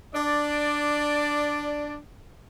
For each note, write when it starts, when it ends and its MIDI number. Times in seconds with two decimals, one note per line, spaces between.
0.14 1.97 62
0.14 1.97 74